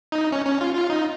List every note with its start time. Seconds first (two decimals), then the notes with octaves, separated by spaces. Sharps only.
0.12 D#4
0.32 C#4
0.46 C#4
0.61 F4
0.75 F4
0.90 D#4